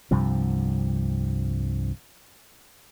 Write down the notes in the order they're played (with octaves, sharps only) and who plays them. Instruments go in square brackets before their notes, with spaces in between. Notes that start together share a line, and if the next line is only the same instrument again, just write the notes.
[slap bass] C2 G2 C3 F3